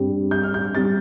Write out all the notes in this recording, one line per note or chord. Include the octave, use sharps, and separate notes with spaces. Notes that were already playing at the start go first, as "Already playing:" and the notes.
Already playing: G2 G3 C4
G6
F6
G6
G3 C4 A6